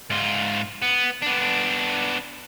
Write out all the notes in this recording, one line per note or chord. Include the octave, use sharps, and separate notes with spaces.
G#2 F4
B3
B3 D4